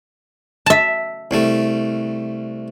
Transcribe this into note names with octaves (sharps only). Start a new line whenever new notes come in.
E5 A5
C2 G3 A3